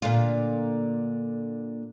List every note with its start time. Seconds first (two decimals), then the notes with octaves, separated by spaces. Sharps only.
0.02 A#2 D3 F4